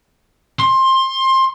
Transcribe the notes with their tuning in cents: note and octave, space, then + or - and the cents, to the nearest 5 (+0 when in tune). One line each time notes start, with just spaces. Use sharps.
C6 +20